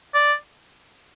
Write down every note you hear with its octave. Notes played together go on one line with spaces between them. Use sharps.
D5